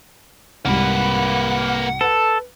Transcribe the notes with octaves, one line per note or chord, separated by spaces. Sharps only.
C2 G#2 G3 A#3 B4 F#5
A4 B4